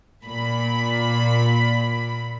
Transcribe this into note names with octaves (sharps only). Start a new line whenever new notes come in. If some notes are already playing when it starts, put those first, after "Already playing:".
A#2 B5